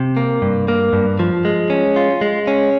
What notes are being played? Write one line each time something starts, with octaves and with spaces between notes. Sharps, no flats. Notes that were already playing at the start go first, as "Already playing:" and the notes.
Already playing: C3
A#3
G2
A#3
G2
F3
G#3
C#4
F4
G#3
C#4